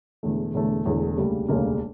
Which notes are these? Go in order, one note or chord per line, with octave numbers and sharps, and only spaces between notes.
E1 E2 D3 A3
E1 E2 D3 A3
E1 E2 D3 A3
E1 D2 C#3 G3 A#3
E1 D2 C#3 G3 A#3